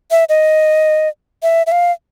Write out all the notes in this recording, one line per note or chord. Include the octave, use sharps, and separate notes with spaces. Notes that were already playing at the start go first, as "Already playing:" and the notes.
E5
D#5
E5
E5
F5